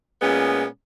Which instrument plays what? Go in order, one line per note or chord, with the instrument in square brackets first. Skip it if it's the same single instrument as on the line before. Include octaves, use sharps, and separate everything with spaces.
[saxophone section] A#2 G#3 B3 C#4